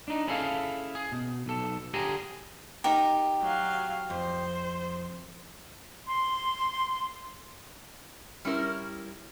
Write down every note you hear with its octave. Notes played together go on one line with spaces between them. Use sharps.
D4 D#4
C#4 E4 G#4 A4 C5 F5
G#4
B2
B1 A4
D3 G4 G#4 G#5 A#5
D#4 G4 A#4
F#3 F5
F2 C5
C6
G3 C#4 E4 A#4